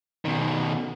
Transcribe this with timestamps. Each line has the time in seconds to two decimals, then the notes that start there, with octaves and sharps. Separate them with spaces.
0.25 B2 D#3